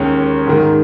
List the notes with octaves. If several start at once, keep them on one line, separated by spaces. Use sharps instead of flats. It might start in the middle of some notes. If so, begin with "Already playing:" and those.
Already playing: D#2 D#3 G#3 C#4
G#2 D#3 G#3